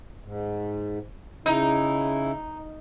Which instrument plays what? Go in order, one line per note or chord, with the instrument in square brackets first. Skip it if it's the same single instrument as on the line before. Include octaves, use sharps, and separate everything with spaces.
[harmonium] G#2
[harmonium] C#3 E4 [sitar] D#4